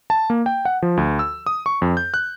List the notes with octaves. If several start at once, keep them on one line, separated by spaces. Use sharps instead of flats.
A5
A#3
G5
F#5
F3
D2
E6
D#6
C#6
F2
G6
F#6